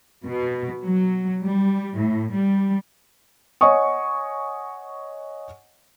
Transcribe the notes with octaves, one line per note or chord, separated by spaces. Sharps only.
B2
F#3
G3
A2
G3
C#5 D#5 F#5 G#5 C#6 D#6